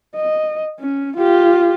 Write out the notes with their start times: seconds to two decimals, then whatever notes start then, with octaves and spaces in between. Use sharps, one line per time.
0.16 D#5
0.80 C#4
1.17 F4 G4